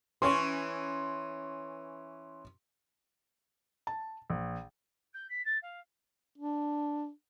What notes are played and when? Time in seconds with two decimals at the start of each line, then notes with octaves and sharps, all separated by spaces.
0.22 E3 C#4 C6 C#6
3.87 A5
4.30 A#1
5.13 G6
5.29 B6
5.45 A6
5.62 F5
6.38 D4